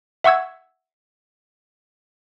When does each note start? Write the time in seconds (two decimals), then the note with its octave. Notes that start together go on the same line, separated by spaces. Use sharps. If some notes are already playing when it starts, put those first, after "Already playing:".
0.24 E5 F#5 C#6 E6 G#6